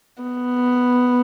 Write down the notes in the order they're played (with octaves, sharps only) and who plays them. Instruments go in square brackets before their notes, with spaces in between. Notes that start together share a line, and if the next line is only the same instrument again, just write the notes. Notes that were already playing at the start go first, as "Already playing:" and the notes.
[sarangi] B3